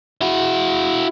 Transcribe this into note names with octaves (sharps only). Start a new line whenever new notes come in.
E4 F#4